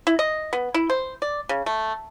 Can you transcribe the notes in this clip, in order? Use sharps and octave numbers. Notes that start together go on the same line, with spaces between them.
E4
D#5
B3
E4
C5
D5
C#3
A3